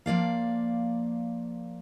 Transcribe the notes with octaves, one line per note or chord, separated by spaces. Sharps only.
F3 A#3 D5 F5